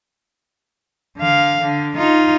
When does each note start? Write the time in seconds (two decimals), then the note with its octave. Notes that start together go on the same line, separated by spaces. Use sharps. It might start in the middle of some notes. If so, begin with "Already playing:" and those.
1.18 D3 F5
1.62 D3
1.96 D#4 F4